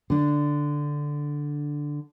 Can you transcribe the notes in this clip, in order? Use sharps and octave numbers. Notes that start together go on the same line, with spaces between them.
D3 D4